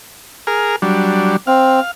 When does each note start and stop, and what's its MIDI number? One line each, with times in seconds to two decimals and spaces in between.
0.47 0.76 68
0.47 0.76 70
0.47 0.76 89
0.82 1.36 54
0.82 1.36 55
0.82 1.36 62
1.47 1.80 60
1.47 1.91 77